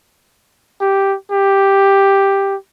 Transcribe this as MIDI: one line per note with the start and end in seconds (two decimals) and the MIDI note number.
0.81 1.15 67
1.32 2.56 67